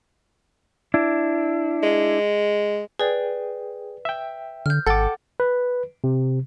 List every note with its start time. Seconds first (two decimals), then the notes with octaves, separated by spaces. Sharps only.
0.94 D4 E4
1.83 G#3
2.99 G#4 B4 D5 G5
4.05 E5 G5
4.66 D3 F6 G6
4.87 G#1 A4 F#5 G5 D6 A6
5.40 B4
6.04 C3